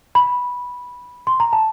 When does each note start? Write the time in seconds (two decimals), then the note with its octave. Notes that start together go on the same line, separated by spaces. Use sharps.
0.15 B5
1.27 C6
1.40 A#5
1.53 A5